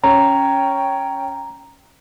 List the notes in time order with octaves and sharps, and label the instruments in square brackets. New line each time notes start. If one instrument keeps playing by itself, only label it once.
[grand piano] C#4 [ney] G5 [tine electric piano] A#5